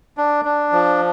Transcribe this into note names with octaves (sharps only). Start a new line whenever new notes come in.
D4
D4
F3